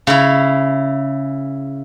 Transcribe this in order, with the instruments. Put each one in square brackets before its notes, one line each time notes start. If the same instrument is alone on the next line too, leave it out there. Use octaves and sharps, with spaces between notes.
[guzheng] C#3 C#4 E4